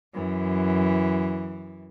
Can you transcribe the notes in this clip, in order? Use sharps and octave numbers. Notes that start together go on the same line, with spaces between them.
F#2 E3